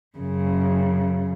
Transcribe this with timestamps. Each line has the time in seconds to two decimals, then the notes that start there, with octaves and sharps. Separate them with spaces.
0.17 F#2 C#3